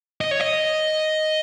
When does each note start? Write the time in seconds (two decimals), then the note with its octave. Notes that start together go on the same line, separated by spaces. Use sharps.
0.21 D#5
0.31 C#5
0.40 D#5